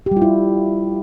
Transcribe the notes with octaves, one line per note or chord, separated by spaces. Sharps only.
G4
G3
F4
E4